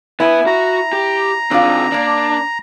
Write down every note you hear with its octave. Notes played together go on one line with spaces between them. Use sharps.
B3 E4 B4 G#5
F#4 A#5
G4
D#3 C4 D4 F4
A#3 D4 D5